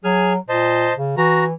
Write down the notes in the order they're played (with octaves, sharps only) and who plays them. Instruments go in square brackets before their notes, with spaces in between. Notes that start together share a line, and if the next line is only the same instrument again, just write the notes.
[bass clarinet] F#3 [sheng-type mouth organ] G#4 G#5 F6
[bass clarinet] A#2 [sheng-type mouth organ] C5 D#5 A5
[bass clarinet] C#3
[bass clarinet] E3 [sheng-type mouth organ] F#4 A#5